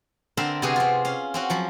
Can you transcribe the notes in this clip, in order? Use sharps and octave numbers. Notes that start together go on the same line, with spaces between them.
D3 C4 A#4 E5 B5 C6
C3 B3 C4 F#4 G#4 G#5
C4 F4
C#4 F5
C4 C#4 F#4
F3 F#3 B5